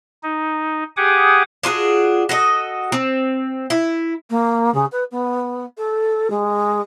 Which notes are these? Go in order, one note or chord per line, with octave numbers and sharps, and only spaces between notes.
D#4
G4 G#4 F#5 G#5 D6 D#6
D4 F4 F#4 G#4
F#4 A4 D#5
C4
E4
A#3
C#3
B4
B3
A4
G#3